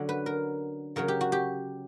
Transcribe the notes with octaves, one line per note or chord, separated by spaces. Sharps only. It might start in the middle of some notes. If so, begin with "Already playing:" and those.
Already playing: D3 F#3 C#4
B4
A#4
C#3 F#3 C#4 A#4
G4
F#4
G4